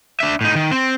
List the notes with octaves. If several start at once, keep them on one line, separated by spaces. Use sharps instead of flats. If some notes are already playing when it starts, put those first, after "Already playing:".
D4 E5
A2 D#4
D#3
C4